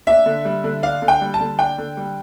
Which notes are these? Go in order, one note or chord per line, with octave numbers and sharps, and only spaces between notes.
D4 E5
D3
G3
D3
D4 F5
D3
G5
G3
A5
D3
D4 G5
D3
G3